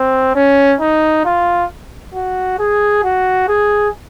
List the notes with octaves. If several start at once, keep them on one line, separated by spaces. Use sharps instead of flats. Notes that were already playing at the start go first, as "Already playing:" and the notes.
Already playing: C4
C#4
D#4
F4
F#4
G#4
F#4
G#4